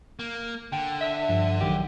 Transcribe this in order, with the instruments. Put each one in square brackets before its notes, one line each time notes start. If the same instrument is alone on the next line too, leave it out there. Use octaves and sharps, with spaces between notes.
[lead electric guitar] A#3
[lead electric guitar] D3 [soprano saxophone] G5
[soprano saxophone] E5
[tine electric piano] G2 F3
[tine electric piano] A#1 D#3 F#3 [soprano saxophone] G4